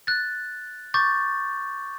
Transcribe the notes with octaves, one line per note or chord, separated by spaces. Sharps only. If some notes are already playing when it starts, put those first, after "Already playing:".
F#6 A6
C#6 D6 G6 A6